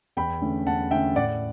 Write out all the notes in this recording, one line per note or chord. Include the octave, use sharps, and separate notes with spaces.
E2 G5 B5
D3 A3 C#4
E2 F#5 A5
D3 A3 C#4 E5 G5
A2 D5 F#5